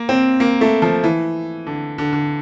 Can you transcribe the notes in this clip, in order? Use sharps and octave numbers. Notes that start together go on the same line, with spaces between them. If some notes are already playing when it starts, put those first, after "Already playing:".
Already playing: A#3
C4
A#3
A3
F3
E3
D3
D3
D3